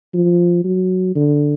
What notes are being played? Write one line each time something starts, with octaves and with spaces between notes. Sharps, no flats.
F3
F#3
D3